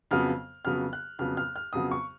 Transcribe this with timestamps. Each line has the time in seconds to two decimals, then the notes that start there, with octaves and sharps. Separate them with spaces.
0.11 F2 C#3 F#3 B3 F6
0.65 F2 C#3 F#3 B3 F6
0.93 F#6
1.19 F2 C#3 F#3 B3 F6
1.37 F6
1.56 F6
1.73 F2 C#3 F#3 B3 D#6
1.91 C#6